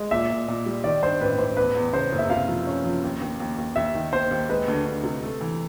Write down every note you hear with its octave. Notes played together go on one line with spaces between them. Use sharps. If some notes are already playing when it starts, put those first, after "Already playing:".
Already playing: G#3
A#2 E5
A#2
A#2
G3
D#3 D5
G2 C5
A1 B4
A1 C5
E2 B4
E2
C#3 C5
F#1
E5
C3 F5
F3
C#4
F3
D#2
D#2
D#2
D#2
D#2 E5
D#3
D#2 C5
D#2
G#3 B4
D2
D2
C3
A3
E3